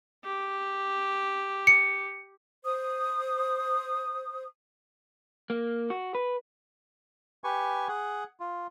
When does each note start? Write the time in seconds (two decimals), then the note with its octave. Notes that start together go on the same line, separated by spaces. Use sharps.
0.25 G4
1.67 C#7
2.64 C5 D#6
5.50 A#3
5.90 F#4
6.15 B4
7.44 G4 B4 G#5 C#6
7.88 G#4 F#5
8.40 F4